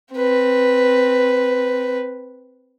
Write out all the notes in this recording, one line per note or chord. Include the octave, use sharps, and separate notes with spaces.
C4 B4